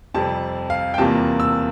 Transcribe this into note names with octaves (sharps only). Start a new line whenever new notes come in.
F2 C3 G3 C4 A5
F5
G5
E2 C3 G3 A#3 F4 A5
E6